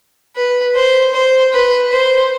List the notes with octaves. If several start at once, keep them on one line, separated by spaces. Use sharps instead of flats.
B4
C5
C5
B4
C5